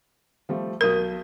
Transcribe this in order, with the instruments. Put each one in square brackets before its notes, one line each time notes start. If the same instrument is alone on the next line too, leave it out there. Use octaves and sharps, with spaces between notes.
[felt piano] F3 G3 A3
[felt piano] B1 D#6 G6 [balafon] A#4